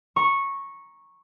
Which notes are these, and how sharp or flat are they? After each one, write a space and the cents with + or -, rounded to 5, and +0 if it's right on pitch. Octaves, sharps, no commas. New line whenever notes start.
A#5 +10 C#6 -10